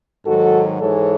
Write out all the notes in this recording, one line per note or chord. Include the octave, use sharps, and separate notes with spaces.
G#2 D#3 F#3 F#4 A4
G#2 E3 G#3 A4 C#5